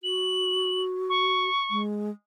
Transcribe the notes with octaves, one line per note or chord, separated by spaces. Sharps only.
F#4 F#7
C#6
G#3